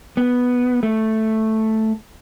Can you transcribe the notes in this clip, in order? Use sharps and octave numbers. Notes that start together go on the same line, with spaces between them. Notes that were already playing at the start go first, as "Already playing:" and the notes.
B3
A3